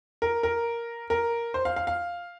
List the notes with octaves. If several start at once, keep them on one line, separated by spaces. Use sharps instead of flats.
A#4
A#4
A#4
C5
F5
F5
F5